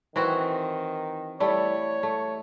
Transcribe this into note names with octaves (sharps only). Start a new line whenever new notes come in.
D#3 E3 C4 F#4
G3 A3 E4 C#5
A3